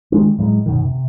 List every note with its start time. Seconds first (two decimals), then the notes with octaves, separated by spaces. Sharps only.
0.12 D#3 G#3 D4
0.38 A2 F#3 G#3
0.66 F#2 B2 D#3
0.85 C3